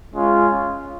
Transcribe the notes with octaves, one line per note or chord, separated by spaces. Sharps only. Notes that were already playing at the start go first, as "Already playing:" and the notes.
G#3 C#4 F4